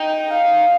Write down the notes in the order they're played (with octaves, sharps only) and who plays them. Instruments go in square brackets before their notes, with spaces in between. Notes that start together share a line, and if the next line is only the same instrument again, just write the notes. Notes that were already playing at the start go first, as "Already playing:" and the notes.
Already playing: [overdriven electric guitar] D#4 [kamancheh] G5
[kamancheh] F5